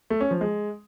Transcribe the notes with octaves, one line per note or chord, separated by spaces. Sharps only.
A3
C#4
F3
G#3